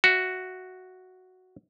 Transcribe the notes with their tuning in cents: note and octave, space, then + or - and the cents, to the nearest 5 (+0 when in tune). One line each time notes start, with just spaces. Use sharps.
F#4 +0 E5 +10